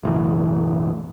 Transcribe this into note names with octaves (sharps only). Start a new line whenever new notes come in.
F#1 B1 A2 E3